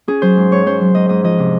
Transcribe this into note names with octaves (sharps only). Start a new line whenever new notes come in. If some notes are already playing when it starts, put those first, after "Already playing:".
C#4 G#4
F#3 C5
G#2
G#2 C#5
C#4 C5
F#3
G#2 D#5
G#2 D#5
F3 D#5
C3